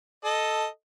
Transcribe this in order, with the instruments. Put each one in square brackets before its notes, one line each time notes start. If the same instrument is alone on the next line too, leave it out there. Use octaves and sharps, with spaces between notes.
[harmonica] A4 D#5